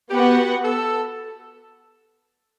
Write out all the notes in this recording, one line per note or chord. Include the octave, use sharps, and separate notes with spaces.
B3 F#4 G4 B4 F#5
A4